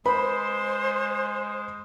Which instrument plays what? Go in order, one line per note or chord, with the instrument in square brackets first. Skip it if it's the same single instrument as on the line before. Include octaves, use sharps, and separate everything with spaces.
[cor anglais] G#3 [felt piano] B4 B5 [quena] C5